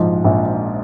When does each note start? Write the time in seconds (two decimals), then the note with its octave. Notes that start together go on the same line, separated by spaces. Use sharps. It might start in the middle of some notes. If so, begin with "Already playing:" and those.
Already playing: A#1 G#2 F3
0.25 A#1